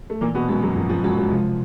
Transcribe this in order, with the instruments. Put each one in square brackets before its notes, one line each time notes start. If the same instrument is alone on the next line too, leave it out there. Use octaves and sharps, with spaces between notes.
[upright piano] A3
[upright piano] A#2 A#3 [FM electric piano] E3
[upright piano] B2 B3
[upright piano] F#2 F#3 [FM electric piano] G#3
[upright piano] F#2 F#3
[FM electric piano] G2 [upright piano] F3
[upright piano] F3
[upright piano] F#2 F#3 [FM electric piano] G#3
[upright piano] F3
[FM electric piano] C3 [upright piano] F3